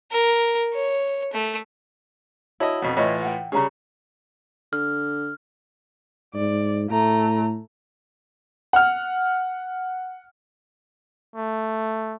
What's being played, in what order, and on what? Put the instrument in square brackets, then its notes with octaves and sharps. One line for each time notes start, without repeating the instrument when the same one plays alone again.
[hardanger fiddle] A#4
C#5
A3
[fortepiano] E4 D#5 [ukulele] F#4 C#5 A5
[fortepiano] F2 B2
[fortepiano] A2 E3 F4 [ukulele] C#5 D#5
[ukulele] F#5 G5
[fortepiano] C#3 G3 C#4 [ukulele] G#4 C#5 A#5
[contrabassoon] D3 [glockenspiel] F6
[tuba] G#2 [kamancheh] D5
[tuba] A2 [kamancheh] A3 A#5
[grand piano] F#5 F6
[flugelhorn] A3